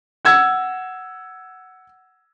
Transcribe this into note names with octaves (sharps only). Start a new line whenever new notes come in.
F#5 E6 G#6